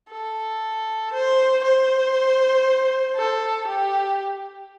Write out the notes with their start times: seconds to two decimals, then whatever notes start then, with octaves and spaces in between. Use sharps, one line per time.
0.11 A4
1.13 C5
1.63 C5
3.16 A4
3.67 G4